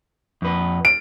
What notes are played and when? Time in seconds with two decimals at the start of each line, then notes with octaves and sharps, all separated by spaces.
0.42 F2 B4
0.85 D7